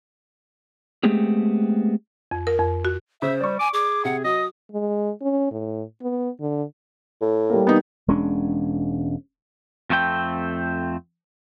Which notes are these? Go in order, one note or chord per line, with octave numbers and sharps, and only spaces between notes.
G#3 A3 B3 C4 G4 G#4
F2
A#4
F2
F#4
C#3 C5 E5
G3 D5 C#6
G#5 D6
G#4 D6
C3 F#5
F#3 D#5 D#6
G#3
C#4
A2
B3
D3
A2
G3 A#3
B3 D#4
E1 G#3 C#4 D4
F2 A3 C4 G5